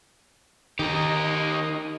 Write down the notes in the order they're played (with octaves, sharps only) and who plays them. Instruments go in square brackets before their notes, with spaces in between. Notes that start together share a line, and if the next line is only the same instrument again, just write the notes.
[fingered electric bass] D#3 [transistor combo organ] D#4 [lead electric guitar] G4 A#4